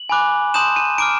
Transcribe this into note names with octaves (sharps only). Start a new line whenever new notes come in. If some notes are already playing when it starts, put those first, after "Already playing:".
Already playing: F#7
G#5 B5 D6 F#6
A5 C6 D#6 G6 E7
D#7
A#5 D6 F6 D7